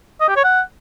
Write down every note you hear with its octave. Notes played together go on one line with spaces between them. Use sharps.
D#5
G4
C#5
F#5